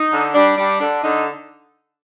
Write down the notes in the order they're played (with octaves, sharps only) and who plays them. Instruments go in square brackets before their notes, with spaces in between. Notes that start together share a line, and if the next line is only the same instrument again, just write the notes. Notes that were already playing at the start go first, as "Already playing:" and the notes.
Already playing: [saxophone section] D#4
D3
G3 D4
G3 D4
D3 D4
D3 D#4